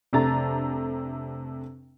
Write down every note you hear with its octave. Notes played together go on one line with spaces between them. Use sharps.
F1 C3 A3 D4 A#5 A6